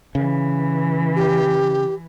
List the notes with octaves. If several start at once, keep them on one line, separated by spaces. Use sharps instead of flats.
C#3 E3
G4